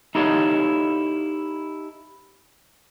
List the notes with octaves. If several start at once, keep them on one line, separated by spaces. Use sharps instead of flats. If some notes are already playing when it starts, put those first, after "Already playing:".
D#4 E4 G4 A4 C#5 F5